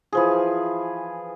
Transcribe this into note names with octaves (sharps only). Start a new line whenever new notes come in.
E3 F3 G#4